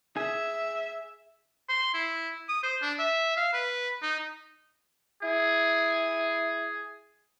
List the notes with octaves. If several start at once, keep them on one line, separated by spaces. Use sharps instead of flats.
G#4 E5
C6
E4
D#6
C5
D4
E5
F5
B4
D#4
E4 G#4